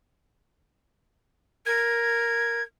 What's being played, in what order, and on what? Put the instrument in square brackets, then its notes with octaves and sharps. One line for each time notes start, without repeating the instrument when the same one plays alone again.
[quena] A#4 [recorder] G#6